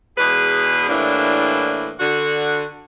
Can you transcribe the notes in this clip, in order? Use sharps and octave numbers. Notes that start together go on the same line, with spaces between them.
E2 B2 G#3 G#4 B4
A2 E3 G3 A#3 D4 E4
D3 F#4